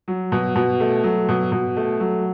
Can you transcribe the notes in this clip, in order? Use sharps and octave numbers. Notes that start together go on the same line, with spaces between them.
F#3
B2
B2
A3
F#3
B2
B2
A3
F#3